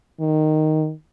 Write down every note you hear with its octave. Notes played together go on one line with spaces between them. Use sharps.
D#3